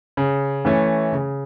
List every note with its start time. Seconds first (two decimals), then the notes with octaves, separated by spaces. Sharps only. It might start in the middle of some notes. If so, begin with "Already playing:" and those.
0.17 C#3
0.65 E3 A3 C#4
1.12 C#3